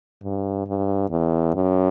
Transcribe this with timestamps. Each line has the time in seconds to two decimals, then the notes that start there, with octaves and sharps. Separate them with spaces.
0.23 G2
0.66 G2
1.10 E2
1.55 F#2